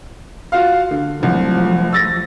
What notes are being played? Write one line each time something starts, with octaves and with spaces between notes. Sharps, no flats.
F4 F#4 F5
D3
C2 F3 F#3 A3
E6 A6 A#6